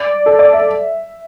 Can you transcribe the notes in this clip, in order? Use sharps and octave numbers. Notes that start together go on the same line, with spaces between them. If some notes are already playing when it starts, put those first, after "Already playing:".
Already playing: D5
A4
D5
E5